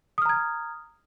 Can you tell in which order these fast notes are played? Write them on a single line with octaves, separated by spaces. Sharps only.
D#6 F6 A#5 G#6